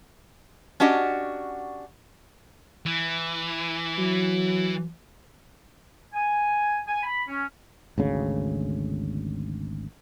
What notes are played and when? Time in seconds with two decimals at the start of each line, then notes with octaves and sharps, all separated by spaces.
0.80 C#4 D4 F#4 G4 D#5
2.86 E3
3.98 F#3
6.13 G#5
6.86 G#5
7.03 B5
7.27 C#4
7.98 G#1 D2 C#3